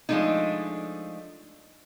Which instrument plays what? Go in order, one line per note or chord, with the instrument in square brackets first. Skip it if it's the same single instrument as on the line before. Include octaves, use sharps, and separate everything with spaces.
[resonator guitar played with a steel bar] F3 G#3 A3 D4 D#4